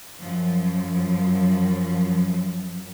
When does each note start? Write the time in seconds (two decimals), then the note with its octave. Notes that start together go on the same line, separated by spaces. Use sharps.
0.19 F#2 F3